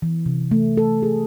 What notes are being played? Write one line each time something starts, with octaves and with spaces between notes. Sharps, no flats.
E3
C3
A3
A4
G#4